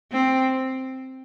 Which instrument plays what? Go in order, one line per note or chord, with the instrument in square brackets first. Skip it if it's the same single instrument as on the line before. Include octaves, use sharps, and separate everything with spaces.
[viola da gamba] C4